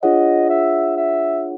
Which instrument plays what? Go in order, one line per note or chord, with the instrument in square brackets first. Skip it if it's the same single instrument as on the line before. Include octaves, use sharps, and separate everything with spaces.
[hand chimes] D4 F4 G#4 C#5 F#5 [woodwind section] D#5
[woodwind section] E5
E5